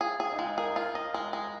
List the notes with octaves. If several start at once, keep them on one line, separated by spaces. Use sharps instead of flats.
F4 G#4
G#4
D#4
G#3 F4
G#4 A#4
F4
D#5
G#3
G#3